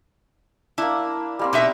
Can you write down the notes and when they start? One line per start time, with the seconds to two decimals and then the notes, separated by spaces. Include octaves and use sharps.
0.78 A#3 D4 E4
1.39 G3 A#3 C4
1.53 B2 D#4 D5 E5 D6